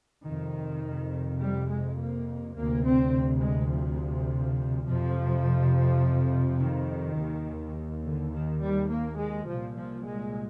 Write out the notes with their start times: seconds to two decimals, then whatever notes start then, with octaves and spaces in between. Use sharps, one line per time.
0.25 F2 C3 D#3
1.41 G3
1.69 G#3
1.98 A#3
2.56 D2 C3 A#3
2.84 C4
3.42 G#3
3.71 F3
4.86 F2 C3 F3
6.59 D#3
7.17 D#2
8.03 D3
8.33 D#3
8.60 G3
8.90 A#3
9.19 G#3
9.47 C2 A#2 F3
9.77 F3
10.05 G#3